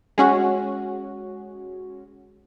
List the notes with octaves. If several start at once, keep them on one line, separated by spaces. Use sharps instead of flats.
G#3 C#4 F#4